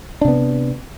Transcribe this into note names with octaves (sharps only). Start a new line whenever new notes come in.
C3 B3 D4